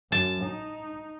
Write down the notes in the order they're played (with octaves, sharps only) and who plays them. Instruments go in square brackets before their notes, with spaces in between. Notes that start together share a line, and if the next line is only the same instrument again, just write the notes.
[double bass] F#2 [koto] A5
[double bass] D#4